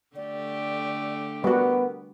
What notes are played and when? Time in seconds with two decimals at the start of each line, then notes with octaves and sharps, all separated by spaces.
0.16 D3 A3 G4 D5
1.44 G3 B3 F#4 A#4